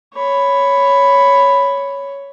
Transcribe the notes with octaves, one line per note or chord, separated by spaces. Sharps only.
C#5 B5